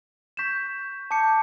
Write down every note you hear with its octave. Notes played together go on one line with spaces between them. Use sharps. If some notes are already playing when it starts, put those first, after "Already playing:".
C#6 G6 B6 E7
A5 D6 G6 C#7